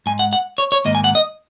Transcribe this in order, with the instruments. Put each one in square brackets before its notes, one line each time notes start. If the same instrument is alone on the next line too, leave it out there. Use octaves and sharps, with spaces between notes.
[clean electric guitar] G#2 G#3 G#5
F#5
F#5
C#5
C#5
G#2 D#3 A#3 D#5
G#5
F#5
D#5